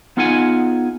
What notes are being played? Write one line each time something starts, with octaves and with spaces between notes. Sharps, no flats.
B3 D#4 F4 G#4 F#5 G#5